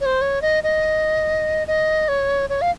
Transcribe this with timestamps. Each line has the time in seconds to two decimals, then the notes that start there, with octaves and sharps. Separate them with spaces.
0.01 C#5
0.06 C5
0.21 C#5
0.42 D#5
0.64 D#5
1.68 D#5
2.08 C#5
2.50 C#5
2.62 F5